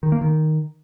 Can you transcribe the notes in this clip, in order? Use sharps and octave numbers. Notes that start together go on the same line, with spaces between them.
D#3
A#3
D#3